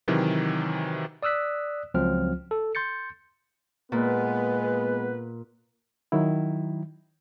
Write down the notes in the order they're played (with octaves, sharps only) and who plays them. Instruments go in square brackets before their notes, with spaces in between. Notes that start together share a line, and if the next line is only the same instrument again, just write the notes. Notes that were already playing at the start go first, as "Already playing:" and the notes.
[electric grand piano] C3 D#3 E3 F#3
[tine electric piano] D5 D#6 E6 F#6 B6
C#2 F3 F#3 C4 F4 F6
A4
C6 G6 A6 C#7
[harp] A#2 [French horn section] G#3 B3 [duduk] B4
[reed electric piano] D#3 F#3 E4